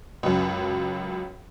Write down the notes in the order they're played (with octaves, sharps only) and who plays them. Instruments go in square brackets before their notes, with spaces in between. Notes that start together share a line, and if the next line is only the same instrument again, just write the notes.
[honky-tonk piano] C#2 F#2